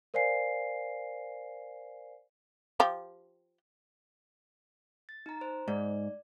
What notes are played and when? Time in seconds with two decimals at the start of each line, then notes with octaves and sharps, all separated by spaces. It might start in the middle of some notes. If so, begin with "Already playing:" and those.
0.14 A#4 C5 D5 F5 G#5 C7
2.80 F3 G4
5.09 A6
5.26 D#4 A#5
5.41 C5
5.68 G#2 D5